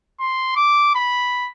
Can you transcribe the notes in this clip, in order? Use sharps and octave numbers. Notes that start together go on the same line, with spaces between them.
C6
D6
B5